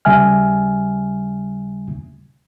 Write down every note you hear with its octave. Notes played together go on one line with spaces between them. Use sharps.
D#2 C#3 G3 E5 G#5 F6